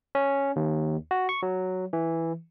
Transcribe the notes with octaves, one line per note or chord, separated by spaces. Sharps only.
C#4
D#2
F#4
C#6
F#3
E3